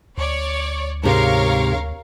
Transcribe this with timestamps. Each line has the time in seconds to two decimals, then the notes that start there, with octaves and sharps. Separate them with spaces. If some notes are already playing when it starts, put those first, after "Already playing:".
0.18 D2 C#5 D5
1.03 G#2 C3 A#4 C#5 F5